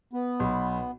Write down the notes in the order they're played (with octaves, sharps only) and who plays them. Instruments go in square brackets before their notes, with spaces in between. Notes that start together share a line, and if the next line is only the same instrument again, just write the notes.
[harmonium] B3
[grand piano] B1